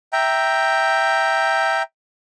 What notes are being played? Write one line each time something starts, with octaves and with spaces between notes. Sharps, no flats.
E5 G5 A#5